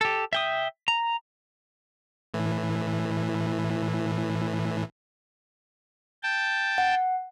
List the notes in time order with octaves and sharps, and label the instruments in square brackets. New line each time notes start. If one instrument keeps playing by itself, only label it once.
[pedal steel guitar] G4 A4
E5 G5 D#6
A#5
[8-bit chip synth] A2 E3
[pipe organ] G5 A5
[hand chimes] F#5